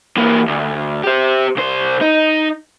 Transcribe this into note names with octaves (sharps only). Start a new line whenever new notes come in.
E3 A#3
D2
G4 C5
C2 C5
D#4